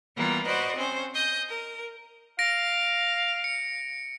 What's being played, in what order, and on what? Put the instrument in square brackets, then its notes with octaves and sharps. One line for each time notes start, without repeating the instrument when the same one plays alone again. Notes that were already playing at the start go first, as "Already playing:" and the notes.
[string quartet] E3 G3 A#3 B3 F4
F#4 B4 C5 D5 D#5
C4 C#4 C5
D#5 G6
A#4
[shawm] F5 [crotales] A#6 D7
[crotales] C#7